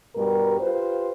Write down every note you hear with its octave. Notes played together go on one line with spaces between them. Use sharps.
G2 B2 G3 A#4
F4 G4 B4 C5